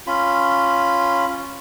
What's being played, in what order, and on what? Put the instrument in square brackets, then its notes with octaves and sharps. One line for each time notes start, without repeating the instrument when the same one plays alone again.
[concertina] C#4 F4 B5